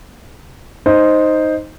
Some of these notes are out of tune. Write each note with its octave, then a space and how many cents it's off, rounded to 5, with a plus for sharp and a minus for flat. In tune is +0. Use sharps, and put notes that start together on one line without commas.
D#4 +0 C5 +0